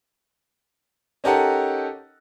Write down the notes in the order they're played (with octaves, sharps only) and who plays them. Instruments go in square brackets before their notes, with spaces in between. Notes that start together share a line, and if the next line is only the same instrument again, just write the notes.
[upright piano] C#4 D#4 G4 A4 A#4 F#5